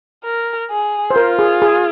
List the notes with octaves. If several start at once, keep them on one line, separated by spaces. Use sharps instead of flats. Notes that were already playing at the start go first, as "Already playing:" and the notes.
A#4
G#4
C5
F4 A#4
G#4
G#4